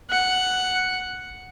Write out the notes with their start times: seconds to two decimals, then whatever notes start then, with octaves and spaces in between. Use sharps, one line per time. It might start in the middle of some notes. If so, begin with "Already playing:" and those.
0.10 F#5